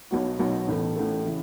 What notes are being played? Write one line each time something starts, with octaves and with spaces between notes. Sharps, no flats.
B1 B2 F#3 B3 F#4
B1 B2 F#3 B3 F#4
A1 A2 A3
A1 A2 A3
C#3 E3